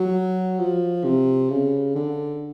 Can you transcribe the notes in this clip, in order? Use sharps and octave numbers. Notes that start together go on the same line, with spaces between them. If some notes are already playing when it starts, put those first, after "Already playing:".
Already playing: F#3
F3
C3
C#3
D3